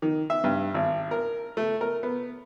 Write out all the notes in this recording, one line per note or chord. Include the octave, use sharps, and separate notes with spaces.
D#3
E5
G2
G#1
A#4
A3
A#4
B3